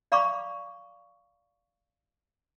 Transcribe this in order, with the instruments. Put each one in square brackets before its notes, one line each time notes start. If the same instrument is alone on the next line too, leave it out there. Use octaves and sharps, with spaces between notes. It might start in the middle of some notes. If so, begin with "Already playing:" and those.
[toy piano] D5 F5 A#5 B5 C#6 D6